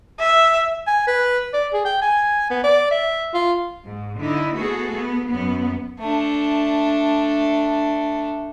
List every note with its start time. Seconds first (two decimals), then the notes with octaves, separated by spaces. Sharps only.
0.20 E5
0.87 G#5
1.07 B4
1.53 D5
1.73 G#4
1.85 G5
2.02 G#5
2.50 B3
2.64 D5
2.91 E5
3.34 F4
3.86 G#2
4.21 D3 D#4 E4
4.57 A3 B3 F#4 G#4 A4
4.96 B3
5.29 F#2 B3
6.00 A3 D4